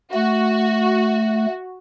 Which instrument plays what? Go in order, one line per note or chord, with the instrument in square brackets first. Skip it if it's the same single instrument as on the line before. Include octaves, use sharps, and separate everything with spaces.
[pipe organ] A3 [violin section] F#4